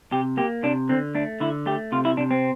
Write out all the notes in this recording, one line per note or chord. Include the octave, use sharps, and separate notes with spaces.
C3 G4
A#3 G4
C3 D4
D3 C4
A3 D4
D3 E4
A3 G4
C3 F4
E4
C3 D4
C4